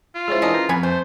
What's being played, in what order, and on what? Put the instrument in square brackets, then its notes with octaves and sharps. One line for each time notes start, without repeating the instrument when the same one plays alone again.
[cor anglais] F4
[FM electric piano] G#3 C#4 E4 [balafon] G#4 C5
[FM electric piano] E3 D4 A#4 [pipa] C#4 E4 D#5
[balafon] B4 [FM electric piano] A#5
[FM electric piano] F2 [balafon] C4 [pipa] F#5 G#5 B5
[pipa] A3 [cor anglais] C5